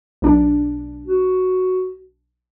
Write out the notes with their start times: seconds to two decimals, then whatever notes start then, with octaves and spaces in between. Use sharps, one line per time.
0.22 B1 D4
1.06 F#4